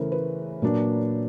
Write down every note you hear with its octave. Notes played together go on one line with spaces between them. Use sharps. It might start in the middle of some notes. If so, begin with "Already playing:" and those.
Already playing: C#3 E3 A3 A#4 C5
B4
A#2 F#3 A#3 D4